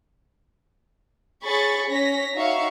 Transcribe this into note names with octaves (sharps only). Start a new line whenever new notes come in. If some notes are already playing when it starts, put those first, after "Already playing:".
G#4 C#5 B5 C#6 A6
C#4 C#5 A#6 B6
D#4 F#4 C#5 E5 F5 C#6